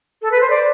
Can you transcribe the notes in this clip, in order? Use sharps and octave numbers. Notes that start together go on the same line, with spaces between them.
A4
B4
C5
D5